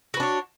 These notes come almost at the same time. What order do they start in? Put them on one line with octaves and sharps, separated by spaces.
F#4 B4 D4 C#5